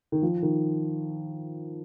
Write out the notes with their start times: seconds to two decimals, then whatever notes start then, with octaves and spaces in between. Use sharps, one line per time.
0.12 D#3
0.22 F3
0.42 D#3